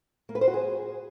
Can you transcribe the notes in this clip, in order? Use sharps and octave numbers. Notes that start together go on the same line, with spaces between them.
A#3
B4
C5
F#4
G#4